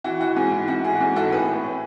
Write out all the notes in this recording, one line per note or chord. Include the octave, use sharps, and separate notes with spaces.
E3 F#4
E3 F#4
G#2 G#4
E3
G#2 F#4
E3 G#4
F#4
G#2 G#4
E3 F#4 A4
A2 G#4 B4
A2
A2